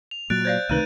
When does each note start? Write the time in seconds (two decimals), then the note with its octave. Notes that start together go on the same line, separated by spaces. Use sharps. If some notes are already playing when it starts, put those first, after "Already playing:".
0.11 F7
0.30 A#2 F#3 F#6 A6 D7
0.45 C5 D5 F5 G6
0.69 C#2 C3 D#3 A3 D#4 B4 D#7